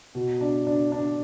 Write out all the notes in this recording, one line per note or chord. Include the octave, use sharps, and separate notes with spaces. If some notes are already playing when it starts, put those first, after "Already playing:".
B2
D4
D4
D4